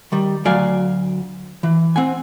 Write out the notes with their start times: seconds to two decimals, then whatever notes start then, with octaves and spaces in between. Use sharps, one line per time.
0.12 D#3 G3
0.45 D2 F#3 D5 F5 G#5
1.63 E3
1.96 C4 F#5 G#5